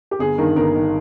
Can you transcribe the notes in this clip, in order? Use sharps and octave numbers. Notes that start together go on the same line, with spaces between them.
G4
G1 G#4
G2 D#3 A#4
G1 A#4
D#3